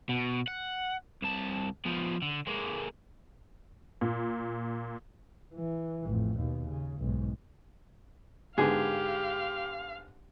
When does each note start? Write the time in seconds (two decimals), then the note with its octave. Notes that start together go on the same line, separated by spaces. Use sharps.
0.09 B2
0.47 F#5
1.22 C2 A5
1.85 F3 B3
2.22 D3
2.47 G#3 A#3
4.01 A#2
5.55 E3
6.07 A1 F2
6.39 D#2 B2
6.69 C#3
6.99 B1 G#2
8.58 G#2 D3 B3 G4 G#4 F5